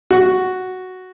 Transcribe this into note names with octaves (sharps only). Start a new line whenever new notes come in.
F#4